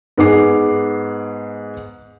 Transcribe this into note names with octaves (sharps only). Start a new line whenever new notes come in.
G#2 B3 G#4 D6 C7